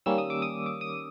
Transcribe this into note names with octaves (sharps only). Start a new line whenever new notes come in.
D#3 G3 A#3 C#4 E6
D#6
D6
D#6
D6
D#6